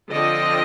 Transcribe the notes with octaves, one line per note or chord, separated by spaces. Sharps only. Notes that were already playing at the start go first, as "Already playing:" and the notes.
D3 F3 C4 D#5